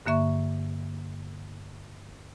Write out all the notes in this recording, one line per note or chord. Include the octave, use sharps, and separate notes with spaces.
G2 D3 A#3 E5 C#6